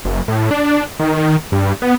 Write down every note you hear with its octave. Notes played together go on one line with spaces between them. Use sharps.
F#1
A2
D4
D#3
G2
B3